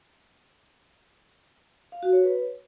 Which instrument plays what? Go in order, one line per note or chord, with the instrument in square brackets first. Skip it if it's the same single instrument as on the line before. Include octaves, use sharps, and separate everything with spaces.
[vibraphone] F5
F#4
C#5
B4